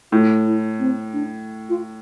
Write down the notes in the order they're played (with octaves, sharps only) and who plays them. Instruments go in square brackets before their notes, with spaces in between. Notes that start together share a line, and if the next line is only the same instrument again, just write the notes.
[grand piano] A2 [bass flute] F4
[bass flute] E4
C4
D4
F4